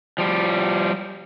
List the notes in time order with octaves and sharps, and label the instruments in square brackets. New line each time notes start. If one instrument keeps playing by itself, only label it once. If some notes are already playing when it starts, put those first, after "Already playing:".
[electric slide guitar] F3 G3